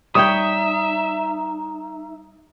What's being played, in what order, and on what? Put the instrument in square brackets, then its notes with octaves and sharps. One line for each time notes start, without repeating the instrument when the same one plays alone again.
[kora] G3 C#5 G5 [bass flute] D#4 [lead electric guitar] E5 [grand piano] D#6